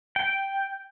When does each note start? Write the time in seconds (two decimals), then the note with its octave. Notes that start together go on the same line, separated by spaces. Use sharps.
0.16 G5